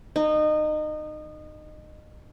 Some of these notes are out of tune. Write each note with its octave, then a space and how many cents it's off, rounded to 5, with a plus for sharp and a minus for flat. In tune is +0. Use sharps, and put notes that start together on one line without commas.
D#4 -25